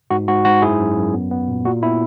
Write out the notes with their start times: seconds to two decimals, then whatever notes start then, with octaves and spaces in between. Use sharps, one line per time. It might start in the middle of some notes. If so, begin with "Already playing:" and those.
0.10 G#2 F#4
0.28 G#2 F#4
0.45 G#2 F#4
0.62 F#2 E4 G#4
0.79 F#2
0.97 F#2
1.14 B3
1.31 B3
1.48 A#2
1.65 A#2 F#4
1.82 B3 E4